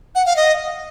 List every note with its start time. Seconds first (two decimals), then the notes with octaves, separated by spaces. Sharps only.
0.15 F#5
0.26 F5
0.36 D#5